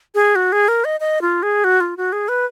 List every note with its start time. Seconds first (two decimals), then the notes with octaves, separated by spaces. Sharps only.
0.15 G#4
0.36 F#4
0.52 G#4
0.68 A#4
0.85 D#5
1.00 D#5
1.21 F4
1.43 G#4
1.64 F#4
1.80 F4
1.97 F#4
2.12 G#4
2.29 B4